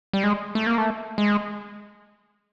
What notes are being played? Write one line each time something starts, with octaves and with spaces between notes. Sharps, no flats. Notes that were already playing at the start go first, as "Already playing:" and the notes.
G3
G#3
A3
A#3
A3
G#3